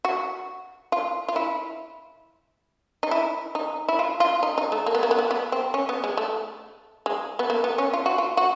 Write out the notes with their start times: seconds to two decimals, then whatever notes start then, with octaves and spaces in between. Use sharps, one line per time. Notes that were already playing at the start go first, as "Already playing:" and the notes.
0.05 F#4
0.92 F4
1.28 F4
1.36 E4
3.03 D#4
3.11 E4
3.55 D#4
3.89 E4
3.99 F4
4.20 F4
4.43 D#4
4.58 D#4
4.72 A3
4.86 A#3
4.95 B3
5.03 A#3
5.11 B3
5.19 A#3
5.31 B3
5.52 C4
5.74 C#4
5.89 B3
6.04 G#3
6.17 A3
7.06 G#3
7.39 B3
7.50 A#3
7.64 B3
7.78 C#4
7.93 F4
8.06 F#4
8.18 F4
8.37 F#4